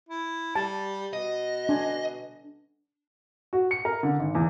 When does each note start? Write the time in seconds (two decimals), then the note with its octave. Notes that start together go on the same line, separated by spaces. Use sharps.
0.09 E4
0.56 G3 A5
1.13 B2 D#5
1.69 D4 G#5
3.53 F#4
3.71 C#7
3.85 A#4
4.03 D3
4.19 G#1
4.35 E2